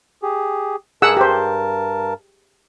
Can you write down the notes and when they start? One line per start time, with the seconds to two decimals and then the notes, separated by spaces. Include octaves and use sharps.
0.23 G4 G#4
1.02 G2 G#4 A#4 F#5 A5 E6
1.17 G4 C5